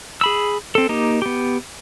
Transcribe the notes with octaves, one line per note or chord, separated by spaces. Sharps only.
G#4 B5 E6
C4 A4
A#3 D#4 G4
B3 G4